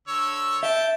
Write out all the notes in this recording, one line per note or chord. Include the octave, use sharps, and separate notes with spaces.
D3 C#5 E6
E5 G5 A5